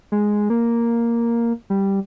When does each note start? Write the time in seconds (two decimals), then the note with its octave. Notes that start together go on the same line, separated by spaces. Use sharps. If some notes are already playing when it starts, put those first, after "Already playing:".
0.12 G#3
0.50 A#3
1.70 G3